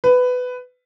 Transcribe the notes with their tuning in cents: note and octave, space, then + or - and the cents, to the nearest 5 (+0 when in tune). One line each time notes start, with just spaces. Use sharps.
B4 +15